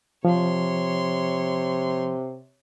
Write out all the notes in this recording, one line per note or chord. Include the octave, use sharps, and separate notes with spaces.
C3 F3 C#5 C6